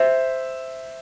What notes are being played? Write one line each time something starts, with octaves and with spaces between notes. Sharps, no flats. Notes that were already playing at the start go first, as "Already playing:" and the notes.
Already playing: C5 E5